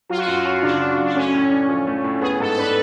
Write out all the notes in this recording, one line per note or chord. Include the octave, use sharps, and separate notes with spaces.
F#3 F4
F#4
F#2 F4
C#4
C#3 D4
F#3
F#2
D4
A3 C#4
A2
D4
F3
A3
A2
B3 G#4
G#2 A4
A4
D4 B4